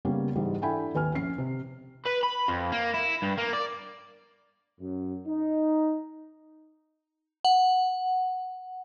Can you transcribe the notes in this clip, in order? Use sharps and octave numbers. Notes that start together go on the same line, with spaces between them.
C#3 G3 A#3 B3 C#4
G#2 E3 G3
D4 E4 A4 G5 G#5 B5
D#2 B4 G#5 F6
A#1 C#4 C7
C3
B4
B5
F2
A#3
E4
G2
A#3
D5
F#2
D#4
F#5